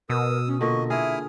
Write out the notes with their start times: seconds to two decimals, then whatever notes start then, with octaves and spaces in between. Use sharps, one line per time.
0.10 B2 A#4 D#6 E6
0.47 C#4
0.61 A#2 D3 D#5 C#6
0.90 E4 G#4 E5 D#6 F6